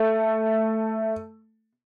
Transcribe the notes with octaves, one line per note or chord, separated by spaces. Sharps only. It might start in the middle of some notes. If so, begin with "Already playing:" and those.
Already playing: A3